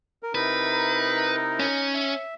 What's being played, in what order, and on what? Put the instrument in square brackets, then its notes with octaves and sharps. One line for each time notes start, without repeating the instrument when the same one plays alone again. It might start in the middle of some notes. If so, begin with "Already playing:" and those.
[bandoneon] A#4
[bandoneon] C3 E4 A#4 [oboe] D#4 [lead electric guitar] B4
[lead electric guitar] C#4
[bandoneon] E5